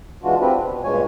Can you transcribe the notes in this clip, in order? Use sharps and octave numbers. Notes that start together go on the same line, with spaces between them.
E3 G#3 D4 F4 F#4
C4 D4 F4 G4 B4
B2
G2 A#2 G#3 C#5 G#5